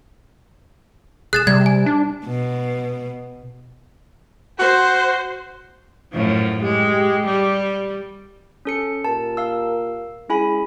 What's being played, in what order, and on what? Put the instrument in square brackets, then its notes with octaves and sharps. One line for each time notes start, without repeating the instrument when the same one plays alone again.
[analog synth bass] E1 [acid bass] G#4 [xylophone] F#6 A6 E7
[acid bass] C3 [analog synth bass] G3 [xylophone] G#6
[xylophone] G#5
[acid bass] D4
[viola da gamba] B2
[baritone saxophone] F#4 [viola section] C5
[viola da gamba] F#2 A2 F3
[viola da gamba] G#3 [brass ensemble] G4
[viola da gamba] G3
[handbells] C#4 A4 C#7
[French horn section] A#2 G4 A#4 [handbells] A5
[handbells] F5 E6
[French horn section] G#3 C#4 G#4 [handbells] E4 G#5 B5